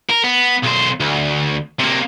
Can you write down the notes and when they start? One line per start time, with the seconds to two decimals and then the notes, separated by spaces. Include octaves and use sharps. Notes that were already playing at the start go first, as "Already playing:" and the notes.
0.09 A#4
0.24 B3
0.64 B1 C5
1.00 D2
1.80 C3 A#3